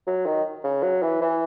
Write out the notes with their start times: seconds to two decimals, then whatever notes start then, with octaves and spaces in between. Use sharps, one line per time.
0.07 F#3
0.26 D#3
0.64 C#3
0.83 F#3
1.03 E3
1.22 E3